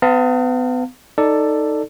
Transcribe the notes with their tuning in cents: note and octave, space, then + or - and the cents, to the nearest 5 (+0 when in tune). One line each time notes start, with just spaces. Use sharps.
B3 +35 F5 +0 A5 +45
D#4 +0 A4 +10 D5 +0